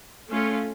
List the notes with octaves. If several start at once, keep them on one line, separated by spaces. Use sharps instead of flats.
A3 C#4 F4